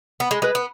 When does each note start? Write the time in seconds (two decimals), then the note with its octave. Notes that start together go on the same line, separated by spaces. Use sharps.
0.20 B3 B5
0.31 G#3
0.42 G#3 B4
0.55 B3